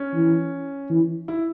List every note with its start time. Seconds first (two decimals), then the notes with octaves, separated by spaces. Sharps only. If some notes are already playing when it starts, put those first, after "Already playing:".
Already playing: C#4
0.14 E3
0.90 E3
1.28 E4